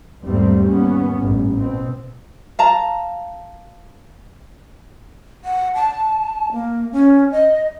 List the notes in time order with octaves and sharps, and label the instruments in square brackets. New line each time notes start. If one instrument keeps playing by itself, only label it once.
[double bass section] E2 G#2 G3 A3 A#3 C4
D#2 A#3 B3 C#4
A1 G2
B2 C4
[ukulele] F5 A5 A#5
[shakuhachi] F#5
A5
A#3
C#4
D#5